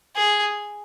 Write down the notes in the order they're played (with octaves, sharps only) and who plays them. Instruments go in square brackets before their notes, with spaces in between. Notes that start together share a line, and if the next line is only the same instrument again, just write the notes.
[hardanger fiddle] G#4